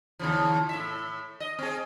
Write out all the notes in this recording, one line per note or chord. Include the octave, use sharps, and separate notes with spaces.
D#2 C#3 F3
A2 E5
D#5
C4 G#4